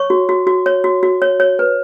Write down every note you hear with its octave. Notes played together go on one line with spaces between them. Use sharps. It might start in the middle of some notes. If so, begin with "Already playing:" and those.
Already playing: C#5 C#6
F#4
F#4
F#4
C#5
F#4
F#4
C#5
C#5
B4